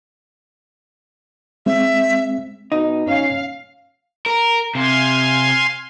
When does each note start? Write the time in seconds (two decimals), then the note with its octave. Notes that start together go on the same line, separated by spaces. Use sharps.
1.66 G#3 C4 E5
2.72 B2 D#4
3.07 C#4 F5
4.26 A#4
4.75 C3 F5 G#5 C6